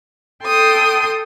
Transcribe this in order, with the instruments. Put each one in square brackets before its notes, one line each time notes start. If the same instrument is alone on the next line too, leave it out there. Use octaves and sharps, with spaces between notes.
[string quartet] A4 G5 C6 D#6